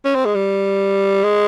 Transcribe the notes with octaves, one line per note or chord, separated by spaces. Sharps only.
C#4
C4
G#3
G3
G#3